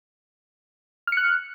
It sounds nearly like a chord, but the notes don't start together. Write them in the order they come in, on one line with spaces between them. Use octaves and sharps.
F6 C#7 F#6